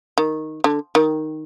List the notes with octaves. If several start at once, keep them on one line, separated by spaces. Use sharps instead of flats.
D#3
D3
D#3